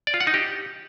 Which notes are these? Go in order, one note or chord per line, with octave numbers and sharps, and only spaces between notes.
D5
F4
F#5
D#4
G4